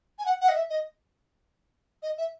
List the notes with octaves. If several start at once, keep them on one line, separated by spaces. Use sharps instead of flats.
G#5
F#5
F#5
D#5
E5
D#5
D#5
E5